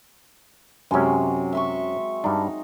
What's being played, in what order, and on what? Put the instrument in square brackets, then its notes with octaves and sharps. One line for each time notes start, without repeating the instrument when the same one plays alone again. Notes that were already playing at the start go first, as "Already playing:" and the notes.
[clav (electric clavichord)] F#2 C#4 [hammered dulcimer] C3 F#3 G#3
[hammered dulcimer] E5 C6 C#6
[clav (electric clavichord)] G2 D4 [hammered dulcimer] D#4